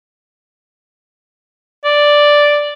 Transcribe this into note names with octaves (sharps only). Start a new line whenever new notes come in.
D5